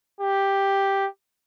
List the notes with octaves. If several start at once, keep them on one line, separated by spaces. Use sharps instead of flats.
G4